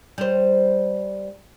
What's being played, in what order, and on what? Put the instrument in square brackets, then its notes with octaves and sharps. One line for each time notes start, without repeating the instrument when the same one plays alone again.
[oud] G3 C5